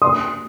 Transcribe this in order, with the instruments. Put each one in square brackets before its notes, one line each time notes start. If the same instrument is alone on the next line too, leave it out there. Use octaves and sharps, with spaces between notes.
[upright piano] C6 D#6